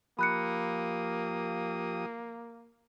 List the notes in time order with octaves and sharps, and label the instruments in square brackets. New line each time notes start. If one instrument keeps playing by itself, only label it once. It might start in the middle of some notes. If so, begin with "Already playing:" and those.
[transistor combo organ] F3 G4 D#6 [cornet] A#3 [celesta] B5 F#6 C#7